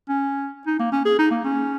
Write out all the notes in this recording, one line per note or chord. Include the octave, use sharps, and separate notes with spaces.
C#4
D#4
A#3
C#4
G#4
D#4
A#3
C#4